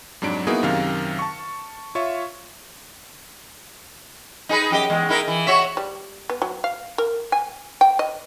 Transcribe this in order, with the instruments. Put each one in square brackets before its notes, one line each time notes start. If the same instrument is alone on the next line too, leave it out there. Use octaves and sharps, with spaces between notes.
[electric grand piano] F2 G#2 F#3 D4 D7
A#3 B3 D#4 E4 F#4 G#4
F#2 C3 D#3 A#4 F5 F6
A5 C#6
F4 C#5 E5 C#6
[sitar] D#4 G#4 B4
F#2 G4 D#5
E2 G#3
D#4 E4 A#4
E3
F#4 C#5 E5
[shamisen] G3
B3
F#3
F5
A#4
G#5
G5
D#5